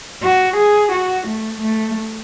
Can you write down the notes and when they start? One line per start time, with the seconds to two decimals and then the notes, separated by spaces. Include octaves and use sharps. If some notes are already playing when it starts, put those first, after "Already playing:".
0.23 F#4
0.56 G#4
0.92 F#4
1.27 A3
1.61 A3